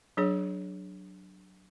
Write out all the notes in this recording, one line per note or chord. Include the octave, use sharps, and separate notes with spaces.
F#3 D4 G#4 C#5